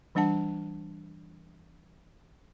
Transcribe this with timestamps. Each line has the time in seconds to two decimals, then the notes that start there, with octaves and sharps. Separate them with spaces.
0.15 E3 G3 D4 F#5 A5